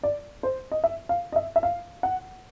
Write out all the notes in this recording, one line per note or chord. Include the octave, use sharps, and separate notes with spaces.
D5
C5
D#5
E5
F5
D#5
E5
E5
F5
F#5